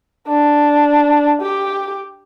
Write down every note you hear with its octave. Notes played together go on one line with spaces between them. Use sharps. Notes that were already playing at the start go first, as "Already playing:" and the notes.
D4
G4